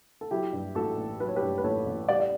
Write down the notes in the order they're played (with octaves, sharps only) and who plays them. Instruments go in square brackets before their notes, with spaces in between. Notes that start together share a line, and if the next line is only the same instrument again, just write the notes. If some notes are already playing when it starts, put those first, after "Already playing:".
[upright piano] A4
F#3 E4 G4
G2
A1 F#4 A4
A1
F#3 B4
C#5
G4 B4
G2
B4
A1 A4 C#5
A1
G3 D5 F#5
D5